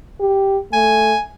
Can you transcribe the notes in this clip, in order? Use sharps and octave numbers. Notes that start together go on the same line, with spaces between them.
G4
A3 G#5